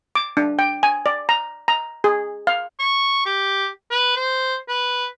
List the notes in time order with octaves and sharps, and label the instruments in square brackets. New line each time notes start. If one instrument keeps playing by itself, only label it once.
[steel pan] D6
D4
G5
G#5
D5
A#5
A#5
G#4
F5
[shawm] C#6
G4
B4
C5
B4